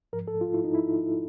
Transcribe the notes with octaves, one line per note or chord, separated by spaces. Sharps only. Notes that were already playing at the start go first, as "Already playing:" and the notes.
G#2 F3 A#4
A4
F4
E4
D#4
E4